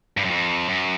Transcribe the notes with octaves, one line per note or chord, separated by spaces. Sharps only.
G2
F#2
F2
F#2